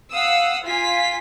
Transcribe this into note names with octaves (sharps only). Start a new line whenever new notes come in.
F5 F#5 D#6 E6
F4 G#5 B6